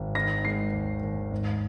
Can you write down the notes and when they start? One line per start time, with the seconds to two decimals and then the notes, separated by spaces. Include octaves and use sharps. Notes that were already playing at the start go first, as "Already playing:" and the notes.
Already playing: G#1
0.15 D#3 A#6
0.44 G#3 C7
0.73 D#2
1.03 D#2
1.32 G#2